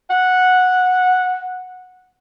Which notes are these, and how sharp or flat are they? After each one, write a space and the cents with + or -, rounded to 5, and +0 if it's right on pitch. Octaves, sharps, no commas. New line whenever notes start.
F#5 -10